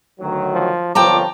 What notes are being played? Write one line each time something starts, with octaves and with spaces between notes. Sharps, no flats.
D2 D#3 F#3
F3
G1 C2 F3 C#5 G5 A5 A#5 D6